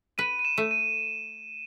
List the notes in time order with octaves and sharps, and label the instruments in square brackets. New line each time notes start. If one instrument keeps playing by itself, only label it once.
[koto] B4 [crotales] D#7
[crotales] D#7
E7
[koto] A3
[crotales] D#7